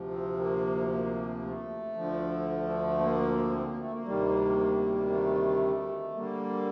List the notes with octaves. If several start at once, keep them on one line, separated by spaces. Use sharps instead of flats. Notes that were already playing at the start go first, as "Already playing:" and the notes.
Already playing: D2 C3 F3
C4
A#3
A#3
A3
D2 D3 F3
A#3
C4
A#3
A3
A#3
D2 C3 D#3 G3
A3
D3 G3 A#3